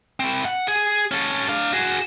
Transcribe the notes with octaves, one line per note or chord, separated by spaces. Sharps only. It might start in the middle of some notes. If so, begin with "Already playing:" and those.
C4 E4
F#5
G#4
C#4 A4
D4 F5
F#4 G#4